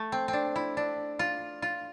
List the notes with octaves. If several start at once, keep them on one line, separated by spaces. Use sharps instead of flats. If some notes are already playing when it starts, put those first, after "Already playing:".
Already playing: A3
C4
C4
D4
E4
D4
F4
F4